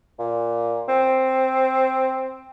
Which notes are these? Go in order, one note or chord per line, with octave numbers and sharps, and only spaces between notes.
A#2
C4